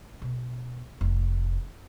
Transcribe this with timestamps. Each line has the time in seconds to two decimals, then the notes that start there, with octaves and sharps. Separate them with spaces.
0.22 B2
1.01 F1